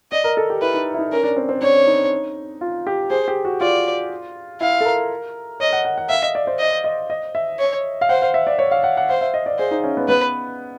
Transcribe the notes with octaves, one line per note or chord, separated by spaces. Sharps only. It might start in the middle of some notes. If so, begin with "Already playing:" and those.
D5 D#5
A#4
A4
G4
E4 B4
D#4
E4
D#4
C#4 A#4
D4
C4
C4
D4 C#5
D#4
F4
G4
G#4 C5
G4
F#4
F4 D5
E4 F5
A4
A#4
C#5 D#5
F#5
F#5
F#5
E5 F5
D#5
D5
C5
D#5
D#5
D#5
E5
C#5
F5
C5 F#5
F5
E5
D5
C#5
F5
F#5
F#5
C5 F5
E5
D#5
D5
G#4 C5
D#4
C#4
B3
B3 B4